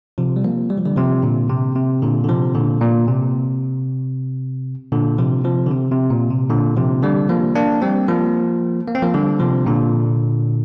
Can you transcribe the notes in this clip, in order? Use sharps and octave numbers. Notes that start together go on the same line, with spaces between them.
C3 F3
G3
F3 A#3
G3
F3
D3 G3
C3 F3
A#2 D3
C3
C3
A#2 D3
D3
C3 F3
A#2 D3
A#2
C3
A#2 D3
C3 F3
C3 F3
D3
C3
C3
A#2
C3
A#2 D3
C3 F3
D3 G3
F3 A#3
A#3 D4
G3 C4
F3 A#3
A#3
C4
F3 A#3
D3 G3
C3 F3
A#2 D3